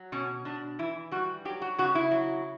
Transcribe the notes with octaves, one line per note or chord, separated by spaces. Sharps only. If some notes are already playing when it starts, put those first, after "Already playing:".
Already playing: F#3
B2 C#4
B2 D4
E3 E4
G3 F#4
F#3 G4
F#4
C#3 F#4
E4
F#3